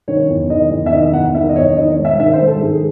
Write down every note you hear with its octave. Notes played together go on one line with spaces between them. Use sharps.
D#3 C#5
E2
D#3 D#5
E2
E5
D#3 D#5
E2 F#5
D#3 E5
D#5
E2 C#5
D#5
D#3 D#5
C#5
G#2
E5
D#3 E5
C5
G#2
A4
D#3 G#4